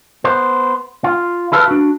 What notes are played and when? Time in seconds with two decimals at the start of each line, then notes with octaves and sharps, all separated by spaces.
0.24 B3 C5
1.04 F4
1.52 E4 G#4 A4 B4 C5 F5
1.68 D4 F#4